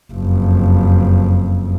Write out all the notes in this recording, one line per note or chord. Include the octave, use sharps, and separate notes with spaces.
F#1 F2